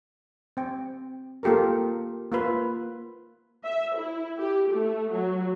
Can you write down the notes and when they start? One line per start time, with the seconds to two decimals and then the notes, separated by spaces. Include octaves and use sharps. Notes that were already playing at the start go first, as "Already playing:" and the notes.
0.57 C4 G5
1.43 A#3 F4 G4 A4 A#4
2.32 A#3 F4 B4
3.65 E5
3.97 E4
4.40 G4
4.71 A3
5.12 F#3